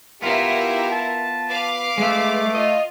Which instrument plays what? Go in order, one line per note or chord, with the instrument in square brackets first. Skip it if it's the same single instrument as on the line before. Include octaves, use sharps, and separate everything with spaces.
[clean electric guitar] B3 F4 [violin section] E4 A#4 [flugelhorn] G4
[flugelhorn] A5
[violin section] B4 F5 D6
[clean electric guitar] G#3 E5 [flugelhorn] A3
[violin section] F4 [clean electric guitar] D#5